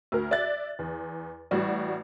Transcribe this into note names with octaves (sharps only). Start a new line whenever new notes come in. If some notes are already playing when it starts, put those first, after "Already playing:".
D2 A#4
D5 E5 F#6 A6
E2
A1 G3 F#4 D5